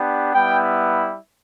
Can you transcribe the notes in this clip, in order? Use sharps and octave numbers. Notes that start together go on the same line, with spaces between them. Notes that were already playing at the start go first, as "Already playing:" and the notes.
Already playing: B3 D4 G4
G3 B3 E4 G5